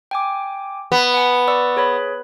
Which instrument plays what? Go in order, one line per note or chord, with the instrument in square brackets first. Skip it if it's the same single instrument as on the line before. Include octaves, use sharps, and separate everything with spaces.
[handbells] G5 G#5 D6
[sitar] B3
[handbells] F#5 G#5
D5 C#6 E6
G#4 C#5 B5